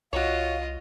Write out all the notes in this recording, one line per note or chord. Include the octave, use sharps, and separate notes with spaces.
C2 F4 F#4 C#5 D#5 F5